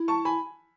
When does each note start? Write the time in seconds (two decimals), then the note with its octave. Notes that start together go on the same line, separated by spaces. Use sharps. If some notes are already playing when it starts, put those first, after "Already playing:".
Already playing: E4
0.08 A5 C#6
0.25 G#5 B5